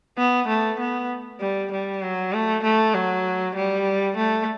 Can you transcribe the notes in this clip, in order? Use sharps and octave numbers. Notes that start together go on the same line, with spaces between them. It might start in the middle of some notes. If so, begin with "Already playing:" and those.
B3
A3
B3
G3
G3
F#3
A3
A3
F#3
G3
A3